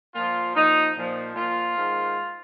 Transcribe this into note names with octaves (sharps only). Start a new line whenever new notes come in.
A#2 F3 F4
A#2 F3 D#4
A#2 F3
A#2 F3 F4
G#2 D#3